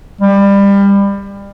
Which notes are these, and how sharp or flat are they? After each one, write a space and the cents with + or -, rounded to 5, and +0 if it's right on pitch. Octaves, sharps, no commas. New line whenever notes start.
G3 +25